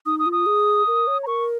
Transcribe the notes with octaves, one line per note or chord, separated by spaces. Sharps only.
D#4 D#6
D#6
F4
D#6
G#4
A#4
C#5
A#5
A#4 C#6